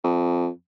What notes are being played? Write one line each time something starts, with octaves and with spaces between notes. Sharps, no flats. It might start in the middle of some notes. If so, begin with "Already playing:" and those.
F2